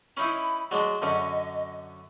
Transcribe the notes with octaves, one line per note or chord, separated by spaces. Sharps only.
C#4 D#4 E4 B5
F#3 G#3 D4 D#5
F#2 D3 C#4